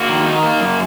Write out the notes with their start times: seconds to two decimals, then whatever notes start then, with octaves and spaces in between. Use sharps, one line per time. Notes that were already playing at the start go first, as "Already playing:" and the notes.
Already playing: A#3 F#4
0.09 D#3
0.26 D#4
0.43 A#3
0.60 F#2